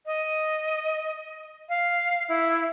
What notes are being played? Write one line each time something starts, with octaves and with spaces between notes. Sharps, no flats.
D#5
F5
E4